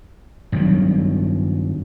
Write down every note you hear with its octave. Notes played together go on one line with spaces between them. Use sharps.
G2 D#3 F#3